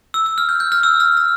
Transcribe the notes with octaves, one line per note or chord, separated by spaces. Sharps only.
E6
E6
F6
G6
G6
F6
E6
F6
F6